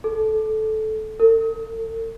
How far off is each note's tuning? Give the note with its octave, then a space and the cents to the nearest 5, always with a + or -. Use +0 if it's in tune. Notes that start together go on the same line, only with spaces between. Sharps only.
A4 -15
A4 +45